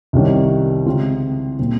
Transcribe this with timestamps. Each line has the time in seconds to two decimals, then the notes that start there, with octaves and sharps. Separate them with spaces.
0.13 C2 C3 D#3 G3 C#4
0.86 C#3 G#3 C4 F4
1.59 A#2 G3 C4